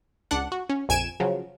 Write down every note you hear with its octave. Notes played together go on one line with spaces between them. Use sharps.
C#2 D4 F#5
F#4
C#4
A#1 F2 G#5 G#6 D7 E7
C#3 F3 F#3